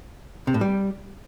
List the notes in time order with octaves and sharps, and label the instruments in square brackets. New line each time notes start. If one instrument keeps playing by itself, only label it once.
[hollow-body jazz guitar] C3
A2
G3